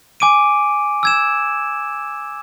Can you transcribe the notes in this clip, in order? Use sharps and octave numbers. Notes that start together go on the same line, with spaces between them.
G#5 D6 D7 D#7
E6 G#6 E7